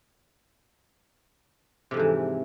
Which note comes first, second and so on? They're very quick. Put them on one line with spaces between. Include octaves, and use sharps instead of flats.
C3 F2 G#2 E3